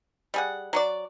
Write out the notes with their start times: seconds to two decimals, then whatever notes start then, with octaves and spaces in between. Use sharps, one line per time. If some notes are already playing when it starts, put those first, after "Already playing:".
0.34 G3 G#4 F#5
0.73 F#3 F#4 D5